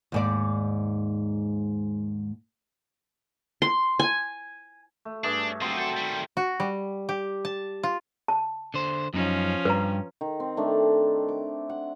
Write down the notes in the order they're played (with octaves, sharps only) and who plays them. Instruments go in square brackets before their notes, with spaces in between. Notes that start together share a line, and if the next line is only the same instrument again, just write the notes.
[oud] D#2 G#2 D5
[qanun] C6
G#5
[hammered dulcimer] A3
[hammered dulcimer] G2 A3 G#4 [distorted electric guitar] D4
[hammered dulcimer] F#3 C4 C6 [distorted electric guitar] G#3 F4
[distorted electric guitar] D3 A4 [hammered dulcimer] G5 A5
[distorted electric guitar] D#3 G3
[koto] F#4
G3
G4
A5
F4
[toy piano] A5
[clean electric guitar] D3 C5
[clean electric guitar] F#2 D#4 [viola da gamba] F3 C#4
[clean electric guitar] G2 [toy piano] B4 A#5
[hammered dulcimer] D#3
C4
D#3 A3 D4 A4
D6
F#5